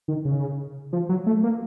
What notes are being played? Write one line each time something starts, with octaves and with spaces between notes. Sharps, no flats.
D#3
C#3
F3
F#3
A3
A#3